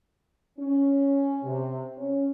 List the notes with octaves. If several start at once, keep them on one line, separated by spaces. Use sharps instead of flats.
C#4
C3
C#4